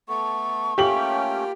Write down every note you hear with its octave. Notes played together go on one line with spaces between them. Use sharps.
A3 B3 A4 C#6
A3 A#3 C#4 F4 G4 G5 F#7